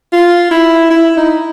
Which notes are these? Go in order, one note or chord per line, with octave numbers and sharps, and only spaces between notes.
F4
E4
E4
D#4